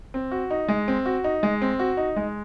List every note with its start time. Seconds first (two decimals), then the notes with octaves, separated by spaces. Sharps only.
0.14 C4
0.31 F#4
0.51 D#4
0.69 G#3
0.88 C4
1.06 F#4
1.24 D#4
1.43 G#3
1.62 C4
1.79 F#4
1.97 D#4
2.16 G#3